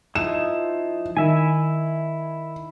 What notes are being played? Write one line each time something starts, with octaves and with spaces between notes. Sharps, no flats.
F3 D#4 E4 E7
D#3 E4 E5 G#5